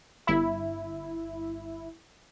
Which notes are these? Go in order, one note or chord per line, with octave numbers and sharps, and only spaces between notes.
G1 E4